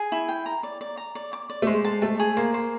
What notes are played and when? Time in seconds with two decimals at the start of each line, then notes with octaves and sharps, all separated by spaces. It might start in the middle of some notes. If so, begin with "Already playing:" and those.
Already playing: G#4
0.12 E4
0.28 G5
0.46 A#5
0.63 D5
0.81 D5
0.97 A#5
1.15 D5
1.33 D6
1.50 D5
1.62 A3
1.67 G#3 C5
1.85 A5
2.02 A3 A5
2.19 G#4
2.37 A#3 C5
2.54 C5